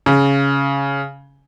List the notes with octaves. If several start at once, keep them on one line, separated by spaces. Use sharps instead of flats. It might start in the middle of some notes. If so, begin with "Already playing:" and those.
C#3